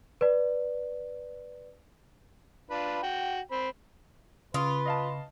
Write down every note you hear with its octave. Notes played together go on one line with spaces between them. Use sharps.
B4 D5
D4 F4 B4
F#4 G5
C4 B5
C#3 F4 B4 C6 D#6
D#5 F5 A5